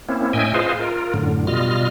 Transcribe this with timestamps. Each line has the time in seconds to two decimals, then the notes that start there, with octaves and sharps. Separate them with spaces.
0.09 A#3 C4 C#4 E4
0.33 A2 C#4 D#5 E5 G5 G#5
0.54 F4 G#4 B4 C5 D#5 F5
0.79 F4 A#4
1.14 F#2 A2 D3
1.47 B2 G3 F4 D#5 F6